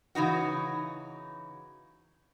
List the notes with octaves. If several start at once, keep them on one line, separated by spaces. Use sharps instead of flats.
C#3 E3 D#4 F#4